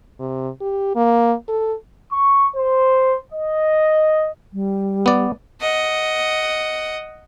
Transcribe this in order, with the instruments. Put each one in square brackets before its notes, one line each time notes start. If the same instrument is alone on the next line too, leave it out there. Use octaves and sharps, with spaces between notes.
[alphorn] C3
G4
A#3
A4
[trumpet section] C#6
C5
D#5
[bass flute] G3
[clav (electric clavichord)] B3 D5
[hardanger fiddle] D#5 F#5